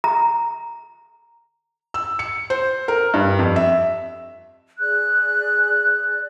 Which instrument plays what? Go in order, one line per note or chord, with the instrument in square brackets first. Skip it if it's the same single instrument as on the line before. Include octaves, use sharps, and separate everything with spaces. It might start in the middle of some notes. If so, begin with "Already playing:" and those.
[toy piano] A#5
[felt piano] E6
C#7
C5
A#4
G2
F2
E5
[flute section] G#4 D5 F#6